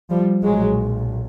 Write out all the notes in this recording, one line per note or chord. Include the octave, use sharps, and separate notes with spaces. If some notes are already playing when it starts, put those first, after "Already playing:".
F3 G3
B1 A#2 F#3 G#3